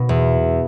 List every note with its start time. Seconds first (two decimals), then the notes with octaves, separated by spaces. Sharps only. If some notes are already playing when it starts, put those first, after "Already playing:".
Already playing: B2
0.09 E2